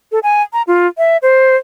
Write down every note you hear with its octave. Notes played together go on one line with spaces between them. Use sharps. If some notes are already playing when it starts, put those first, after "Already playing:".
A4
G#5
A#5
F4
E5
C5